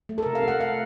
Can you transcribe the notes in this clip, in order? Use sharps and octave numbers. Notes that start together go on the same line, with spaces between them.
A3
A4
C3 A#4
F5
A3 F#5
A3 F5